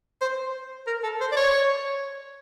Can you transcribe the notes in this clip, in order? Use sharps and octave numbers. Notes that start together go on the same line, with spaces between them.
C5
A#4
A4
C5
D5
C#5